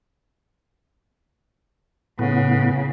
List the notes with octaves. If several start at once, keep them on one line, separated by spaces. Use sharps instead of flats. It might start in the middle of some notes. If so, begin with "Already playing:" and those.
A2 C#3 B3